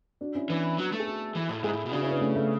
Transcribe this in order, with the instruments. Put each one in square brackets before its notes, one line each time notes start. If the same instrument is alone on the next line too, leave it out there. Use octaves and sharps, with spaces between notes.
[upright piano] D4 F#4
C#4 E4
[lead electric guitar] E3 [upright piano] B3 D4
[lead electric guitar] F#3
A3
[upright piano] G#4
F#4 A4
[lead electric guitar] E3
A2
[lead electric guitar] G#2 [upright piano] E4 G#4
[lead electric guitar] A2
B2
[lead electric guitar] C#3 [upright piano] D4 F#4
[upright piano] C#4 E4
B3 D4
A3 C#4
A3